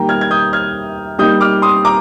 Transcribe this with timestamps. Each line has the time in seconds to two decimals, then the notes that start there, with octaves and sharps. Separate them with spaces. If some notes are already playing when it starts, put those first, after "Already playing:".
Already playing: D#3 G3 A#3 G5 A#5
0.09 F6 G#6
0.21 G#6
0.31 D#6 G6
0.53 F6 G#6
1.19 G3 A#3 D#4 D#6 G6
1.41 D6 F6
1.62 C6 D#6
1.85 A#5 D6